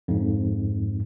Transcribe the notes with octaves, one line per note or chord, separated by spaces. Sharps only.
F2 G#2